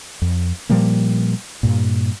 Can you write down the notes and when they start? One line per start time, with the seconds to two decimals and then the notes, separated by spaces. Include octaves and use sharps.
0.22 F2
0.69 A#2 F3 G3 A#3
1.63 G2 A#2